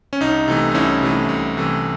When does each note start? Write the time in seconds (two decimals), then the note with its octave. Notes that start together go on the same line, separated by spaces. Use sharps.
0.13 C#4
0.20 C2 D#4
0.48 C3 E3 A3
0.71 D#4
0.74 C2 C#4 E4
1.03 C3 E3 A3
1.29 C2
1.57 C3 E3 A3